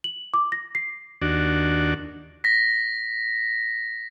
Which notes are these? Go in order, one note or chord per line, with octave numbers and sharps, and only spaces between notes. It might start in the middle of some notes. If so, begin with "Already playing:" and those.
F#7
D6
A#6
C7
D#2 D4 F#4
A#6 B6